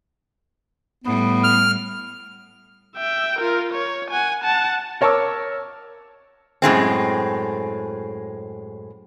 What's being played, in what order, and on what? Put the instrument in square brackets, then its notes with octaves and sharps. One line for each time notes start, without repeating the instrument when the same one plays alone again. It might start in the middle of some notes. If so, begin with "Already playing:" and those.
[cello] A2 G3 [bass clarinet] B3
[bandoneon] F6
[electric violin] E5 G5
F4 A#4
C#5
F#5 G#5
F#5 A5
[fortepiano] A#4 C#5 A5 C#6 D6 E6
[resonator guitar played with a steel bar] F#2 A2 G#3 C4